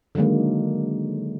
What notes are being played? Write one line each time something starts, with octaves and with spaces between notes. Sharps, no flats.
D3 D#3 F#3 G#3 A#3